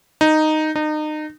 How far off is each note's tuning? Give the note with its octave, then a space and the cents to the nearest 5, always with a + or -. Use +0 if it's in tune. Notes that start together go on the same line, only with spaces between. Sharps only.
D#4 -5
D#4 -30